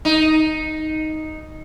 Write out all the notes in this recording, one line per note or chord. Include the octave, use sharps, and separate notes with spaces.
D#4